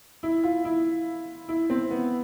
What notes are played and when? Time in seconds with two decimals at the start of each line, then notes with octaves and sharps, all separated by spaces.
0.23 E4
0.44 F4
0.65 E4
1.49 E4
1.70 C4
1.91 B3